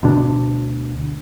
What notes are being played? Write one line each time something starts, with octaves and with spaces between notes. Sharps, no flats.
D2 B2 D4